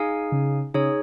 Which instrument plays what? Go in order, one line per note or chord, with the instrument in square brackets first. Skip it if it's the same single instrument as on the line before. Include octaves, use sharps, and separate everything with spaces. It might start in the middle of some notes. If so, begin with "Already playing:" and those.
Already playing: [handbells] D#4 G#4 F5 G#5
[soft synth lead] C#3
[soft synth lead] C#3 [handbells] D#4 G#4 C#5